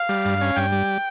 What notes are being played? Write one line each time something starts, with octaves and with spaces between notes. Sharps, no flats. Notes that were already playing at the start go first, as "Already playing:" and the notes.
Already playing: F5
G3
G2
C#4
G2 G5
G3